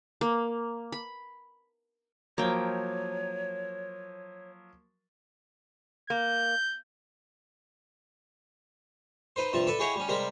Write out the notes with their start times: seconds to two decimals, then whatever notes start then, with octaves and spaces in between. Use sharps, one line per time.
0.21 A#3
0.92 B5
2.38 F3 F#3 A#3 C#5 G5
6.10 A#3 G6
9.36 D#4 B4 C5
9.53 G2 C3 F3 A5
9.67 A4 B4 D5 E5
9.79 E4 G4 G#4 C#5 D#5 F#5
9.96 G3 C#4
10.08 C3 G3 G#3 A#4 B5